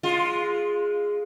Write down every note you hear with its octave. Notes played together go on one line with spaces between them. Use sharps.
G#3 F4